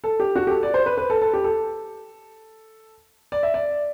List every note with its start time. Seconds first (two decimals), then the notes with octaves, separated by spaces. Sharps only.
0.04 A4
0.20 G4
0.36 F#4
0.47 G4
0.50 A4
0.63 D5
0.74 C5
0.86 B4
0.98 B4
1.10 A4
1.22 A4
1.34 G4
1.44 A4
3.32 D5
3.43 E5
3.54 D5